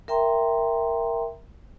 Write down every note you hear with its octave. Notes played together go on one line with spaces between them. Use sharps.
A#4 E5 G5 A#5 C6